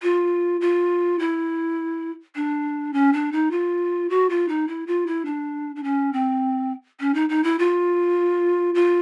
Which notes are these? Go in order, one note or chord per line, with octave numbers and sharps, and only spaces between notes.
F4
F4
E4
D4
C#4
D4
D#4
F4
F#4
F4
D#4
E4
F4
E4
D4
D4
C#4
C4
C#4
D#4
D#4
E4
F4
F4